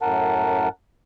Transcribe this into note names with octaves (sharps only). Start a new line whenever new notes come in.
F#2 A2 A#4 F#5 A5